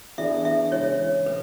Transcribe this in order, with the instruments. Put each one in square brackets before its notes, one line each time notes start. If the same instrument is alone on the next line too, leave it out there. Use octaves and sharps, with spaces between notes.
[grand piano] E3 B3 D4 G#4 D5 [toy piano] E5
[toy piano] E5
[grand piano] C#3 E3 G#3 [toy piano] C#5
[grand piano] B2 A3 [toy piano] B4